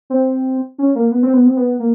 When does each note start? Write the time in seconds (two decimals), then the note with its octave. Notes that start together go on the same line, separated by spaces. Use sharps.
0.10 C4
0.78 C#4
0.95 A#3
1.11 B3
1.23 C4
1.33 B3
1.46 C4
1.57 B3
1.79 A#3